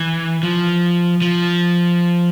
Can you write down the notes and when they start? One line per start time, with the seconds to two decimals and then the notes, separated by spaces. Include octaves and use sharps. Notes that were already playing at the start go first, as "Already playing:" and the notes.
Already playing: E3
0.43 F3
1.22 F3